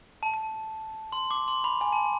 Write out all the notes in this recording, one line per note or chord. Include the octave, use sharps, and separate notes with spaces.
A5
A5
C6
D6
C6
B5
G#5
A5